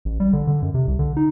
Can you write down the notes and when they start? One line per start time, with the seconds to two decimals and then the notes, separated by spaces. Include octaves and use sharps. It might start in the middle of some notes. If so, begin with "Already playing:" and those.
0.05 A1
0.20 G3
0.33 D3
0.47 D3
0.62 F#2
0.74 C3
0.87 C2
0.99 D3
1.17 D#4